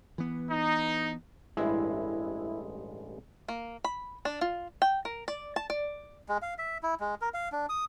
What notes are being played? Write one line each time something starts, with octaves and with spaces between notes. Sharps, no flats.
E3 B3
D#4
A1 G2 G#3 E4
A#3
B5
D4
F4
G5
A#4
D5
A5
D5
G#3
F5
E5
E4
G#3
A#4
F5
D4
D#6